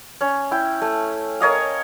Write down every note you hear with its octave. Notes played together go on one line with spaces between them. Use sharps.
C#4
E4 G5
A3
A#4 C#5 D#5 F5